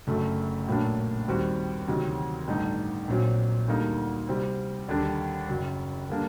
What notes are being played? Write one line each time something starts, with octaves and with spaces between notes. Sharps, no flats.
F#1 F#2 D3 A3
A#1 A2 F#3 A#3 D4
D#2 D#3 G3 C4 F#4
D2 C3 D#3 F#3
A1 G2 D3 A3 D#4
A#1 A#2 F#3 C4
D2 D3 G3 A#3 D#4
C3 G3 C4
D#2 D3 G3 D4
F#1 F#2 F#3
D3 G3 A#3 D4